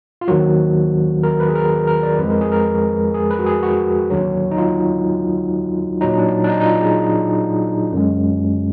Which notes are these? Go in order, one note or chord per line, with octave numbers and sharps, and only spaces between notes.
F4
D#2 D#3 F#3 F#4
A#4
B4
G#4
A#4
A#4
D5
F2 F3 G#3 B4
A#4
G#4
A#4
G#4
B4
F#4
G#4
F#4
D#2 D3 F#3
D#4
F4
A#2 F#3 D#4
D4
D4
D#4
D#4
F4
G#4
F#2 D3 G#3